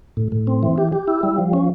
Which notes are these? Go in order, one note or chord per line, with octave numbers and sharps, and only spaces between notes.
A2
A2
C4
E3
G4
G4
E4
G3
F3
C#4